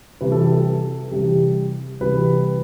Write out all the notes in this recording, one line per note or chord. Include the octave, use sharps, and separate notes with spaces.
C3 E3 G3 B4
A4
G4
A4
C3 E3 G3
C3 E3 G3 B4